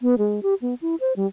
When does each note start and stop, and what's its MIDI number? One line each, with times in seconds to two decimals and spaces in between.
0.01 0.18 59
0.18 0.42 56
0.43 0.54 67
0.62 0.74 59
0.82 0.95 64
1.00 1.13 72
1.16 1.26 55